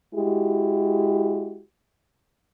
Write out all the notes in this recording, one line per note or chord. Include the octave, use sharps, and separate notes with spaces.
G#3 E4 F#4 G4